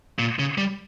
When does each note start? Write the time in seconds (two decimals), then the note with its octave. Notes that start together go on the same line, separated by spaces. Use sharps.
0.19 A#2
0.39 C#3
0.58 G3